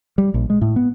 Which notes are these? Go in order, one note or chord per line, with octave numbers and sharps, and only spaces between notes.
G3
A#1
G#3
A2
B3